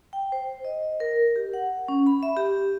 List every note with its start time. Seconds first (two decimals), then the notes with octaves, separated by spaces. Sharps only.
0.13 G5
0.32 C5
0.65 D#5
1.00 A#4
1.36 G4
1.54 F#5
1.88 C#4
2.07 B5
2.23 E5
2.37 G4